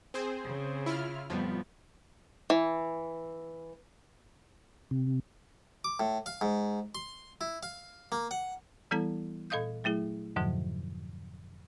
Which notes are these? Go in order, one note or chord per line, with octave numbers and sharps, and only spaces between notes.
C4 G#4 C5
C#3
E4 F4 F6
F2 A2 F3 G3 B3
E3
C3
D6
A2
F5
G#2
C6
E4
F5
A#3
F#5
E3 G3 B3 E4 A4 A#5
A#2 A4 D#5 F5 D#6 G6
F#3 A3 E4 G#4
F2 G#2 B2 D3 F3 F#3